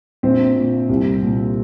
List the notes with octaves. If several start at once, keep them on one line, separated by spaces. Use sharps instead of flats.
A#1 C4
A#2
C2
A#2